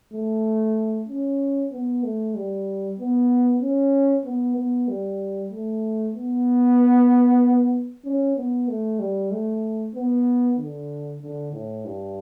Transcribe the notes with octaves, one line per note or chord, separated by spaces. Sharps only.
A3
C#4
B3
A3
G3
B3
C#4
B3
B3
G3
A3
B3
C#4
B3
A3
G3
A3
B3
D3
D3
A2
G2